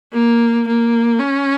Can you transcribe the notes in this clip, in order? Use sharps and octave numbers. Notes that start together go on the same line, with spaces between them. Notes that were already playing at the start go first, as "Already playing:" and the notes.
A#3
A#3
C#4